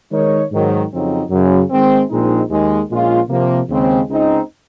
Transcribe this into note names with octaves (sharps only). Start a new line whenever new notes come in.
D#3 G#3 D#4 A#4 C#5
G#2 D#3 F#3
F2 C#3 F#3 C4 D#4
F#2 C#3 F#3
G#2 D#3 G#3 C4
A#1 A#2 G#3 C4 D#4
D#2 D#3 G#3
A#1 A#2 G#3 C#4 F4
C3 F3 A#3
D#2 C#3 G#3 C4
C#2 C#3 G#3 C4 D#4